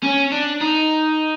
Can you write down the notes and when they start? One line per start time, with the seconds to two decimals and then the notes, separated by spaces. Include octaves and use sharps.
0.03 C#4
0.32 D4
0.61 D#4